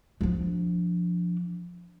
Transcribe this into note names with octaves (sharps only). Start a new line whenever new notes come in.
F3 D4